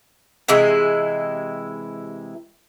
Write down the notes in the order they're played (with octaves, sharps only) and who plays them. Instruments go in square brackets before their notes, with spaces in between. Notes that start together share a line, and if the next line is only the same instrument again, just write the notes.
[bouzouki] C3 E3 G#3 E4